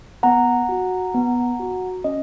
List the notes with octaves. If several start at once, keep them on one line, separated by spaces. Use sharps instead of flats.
B3 F#5 A#5
F#4
B3
F#4
C#4 D#5